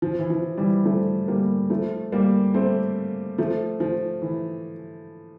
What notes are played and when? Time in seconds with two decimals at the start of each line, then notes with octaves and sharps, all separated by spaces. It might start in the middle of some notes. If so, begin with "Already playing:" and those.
0.02 F3
0.19 E3
0.30 F3
0.57 E3 G3
0.85 F3 A3
1.28 G3 A#3
1.70 F3 A3
2.12 G3 A#3
2.54 A3 C4
3.38 F3 A3
3.80 F3
4.22 E3